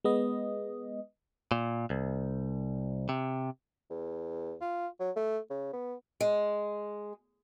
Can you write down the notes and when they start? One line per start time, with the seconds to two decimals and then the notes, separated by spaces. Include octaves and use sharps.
0.04 G#3 B3 D#5
1.52 A#2
1.90 C2
3.09 C3
3.90 E2
4.61 F4
5.00 F#3
5.16 A3
5.50 C#3
5.73 B3
6.21 G#3